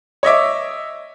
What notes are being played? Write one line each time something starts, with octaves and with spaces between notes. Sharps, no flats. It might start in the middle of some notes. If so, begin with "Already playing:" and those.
C#5 D#5 E5 D6